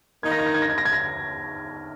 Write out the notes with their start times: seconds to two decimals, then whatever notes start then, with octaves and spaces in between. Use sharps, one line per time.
0.23 D#3 A#3 D#4 G#6
0.31 A#6
0.39 G#6
0.46 A#6
0.54 G#6
0.62 A#6
0.70 G#6
0.78 A#6
0.85 G#6
0.93 A#6